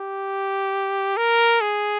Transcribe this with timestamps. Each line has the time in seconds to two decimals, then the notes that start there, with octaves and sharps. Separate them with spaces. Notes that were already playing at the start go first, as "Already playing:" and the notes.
Already playing: G4
1.17 A#4
1.61 G#4